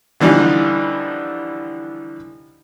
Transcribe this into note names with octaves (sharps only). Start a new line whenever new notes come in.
D3 E3 F3 G3 D4 D#4